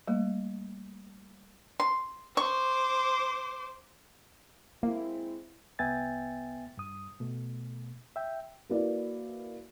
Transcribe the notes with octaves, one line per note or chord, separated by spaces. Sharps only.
G3 A3 A#3
C6
C5 C#6 D6
G#3 A#3 C4 E4
C2 B3 E5 G5 G#5 A6
G2 D#6
B2 A3
E5 G5
A#3 E4 F#4 B4 D5